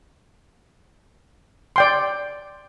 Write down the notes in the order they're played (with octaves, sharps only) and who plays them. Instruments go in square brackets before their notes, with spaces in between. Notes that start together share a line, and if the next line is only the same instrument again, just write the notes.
[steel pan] D5 G5 C6